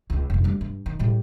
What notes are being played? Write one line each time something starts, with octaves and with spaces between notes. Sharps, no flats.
C#2 C#4
F1 G#2
D3 G3
G2
D#3
A2 G3